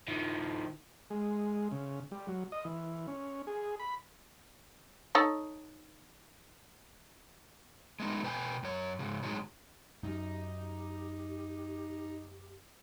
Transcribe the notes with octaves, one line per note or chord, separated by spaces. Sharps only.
D#3 F3
G#3
C#3
G3
F#3
D#5
E3
C#4
G#4
B5
D#4 A4 C#5
G#3 A3 B3 D#4
B2 B4 G5 G#5
F#2 C#5
G#2 C#3
A2 D3 D#3 F#3 G#3
F#2 D#4 G4